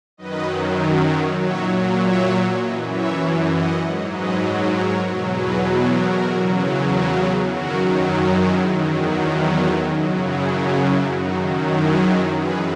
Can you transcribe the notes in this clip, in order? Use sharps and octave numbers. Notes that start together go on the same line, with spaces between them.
F#2 D#3 F#3 B4 D#5
A#4 C#5
A#2 F#3 C#5 E5
C#5 E5
F#2 E3 B4 D#5
C#5 E5
D#5 F#5
G#2 F#3
B4 D#5
A#4 C#5
E2 B2 F#3
G#4 B4
F#4 A#4
E2 C#3 F#3
F#4 A#4
G#4 B4
F#2 D#3 F#3 F#4 A#4
E4 G#4
E2 D#3 F#3
D#4 F#4
C#4 E4
F#2 C#3 F#3 D#4 F#4
E4 G#4
C#4 E4
F#2 D#3 F#3 D#4 F#4
E4 G#4
F#2 E3 G#4 B4